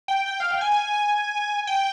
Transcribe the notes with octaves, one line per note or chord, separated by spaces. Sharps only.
G5
G5
F5
G5
G#5
G5